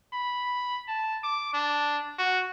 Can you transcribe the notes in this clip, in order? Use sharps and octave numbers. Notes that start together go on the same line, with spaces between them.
B5
A5
D6
D4
F#4